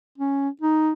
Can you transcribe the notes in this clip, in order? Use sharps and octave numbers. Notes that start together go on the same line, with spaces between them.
C#4
D#4